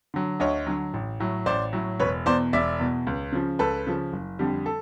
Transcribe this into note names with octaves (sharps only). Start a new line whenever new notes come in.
D3 F#3
D2 C#5 D#5
D3 F#3
A1
A2 F#3
A1 C5 D5
A2 F#3
E1 B4 C#5
E2 B2 C5 D5
E1 D5 E5
E2 B2
C#2
C#3 F3
C#2 A4 B4
C#3 F3
F#1
F2 D3 G3
A4